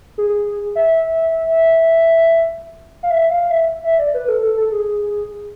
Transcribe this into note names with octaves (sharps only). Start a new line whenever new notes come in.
G#4
E5
F5
E5
F5
E5
E5
D5
B4
A4
A4
A4
G#4